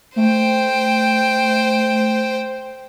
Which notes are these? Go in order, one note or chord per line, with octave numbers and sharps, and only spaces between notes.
A3 C5 G5